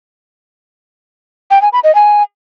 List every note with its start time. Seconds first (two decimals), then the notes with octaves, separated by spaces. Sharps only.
1.51 G5
1.62 G#5
1.73 B5
1.84 D#5
1.95 G#5